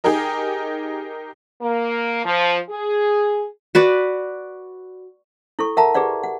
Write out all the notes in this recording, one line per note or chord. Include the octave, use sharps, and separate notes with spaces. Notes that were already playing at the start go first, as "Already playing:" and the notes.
D#4 G4 G#4 A#4 D#5
A#3
F3
G#4
F#4 B4 D5
E4 A4 C#6
A#4 E5 F#5 A5 A#5
G4 G#4 B4 D5 F#5
F#5